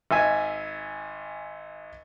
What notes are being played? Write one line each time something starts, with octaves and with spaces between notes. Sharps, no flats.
G#1 E5 G#5